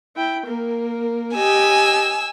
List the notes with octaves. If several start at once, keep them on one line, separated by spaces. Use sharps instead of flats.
E4 G5
A#3 A#4
G4 D#5 G#5 E6